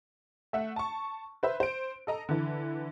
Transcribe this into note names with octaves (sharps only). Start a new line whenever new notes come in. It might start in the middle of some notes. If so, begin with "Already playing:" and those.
A3 E5 F#5
A5 C#6
B4 C5 E5
C5 D7
A4 D#5 A#5
D3 E3